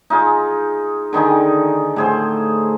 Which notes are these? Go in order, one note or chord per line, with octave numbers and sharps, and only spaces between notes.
D#4 F4 G#4
D3 D#3 D#4 G#4
A2 G#4 C5